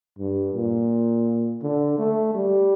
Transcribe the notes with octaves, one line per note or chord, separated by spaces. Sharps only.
G2
A#2
D3
A3
G3